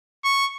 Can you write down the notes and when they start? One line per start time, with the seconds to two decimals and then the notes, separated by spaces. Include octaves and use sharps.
0.25 C#6